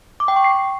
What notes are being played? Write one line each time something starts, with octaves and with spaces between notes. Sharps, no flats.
D6
G5
C#6
C7